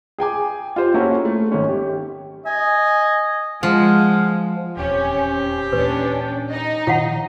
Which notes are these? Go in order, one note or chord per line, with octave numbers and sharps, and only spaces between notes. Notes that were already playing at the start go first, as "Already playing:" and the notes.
G#4 G5 G#5 D6
F4 G4 C5
A#3 C#4 E4 F#4 A4 A#4
A3
G#1 C#4
G4
D#5 G#5
F3 G#3 F5 F#5
D#1 E2 C3 C#4 G4
A#2 E3 C#4 D4 B4
D#4 D#5
A#2 D#3 F3 E4 F5 F#5